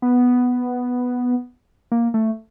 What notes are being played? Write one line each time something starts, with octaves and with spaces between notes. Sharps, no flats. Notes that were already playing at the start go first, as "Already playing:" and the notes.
B3
A#3
A3